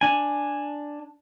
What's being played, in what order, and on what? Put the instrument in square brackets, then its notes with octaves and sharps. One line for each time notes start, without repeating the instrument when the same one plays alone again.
[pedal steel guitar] D4 G#5